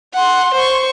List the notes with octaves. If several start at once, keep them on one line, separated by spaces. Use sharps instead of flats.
F#5 C6
C5 C#6